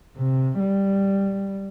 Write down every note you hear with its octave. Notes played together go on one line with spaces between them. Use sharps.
C3
G3